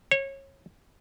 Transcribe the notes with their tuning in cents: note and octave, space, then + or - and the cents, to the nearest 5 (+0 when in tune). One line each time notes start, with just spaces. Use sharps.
C#5 -25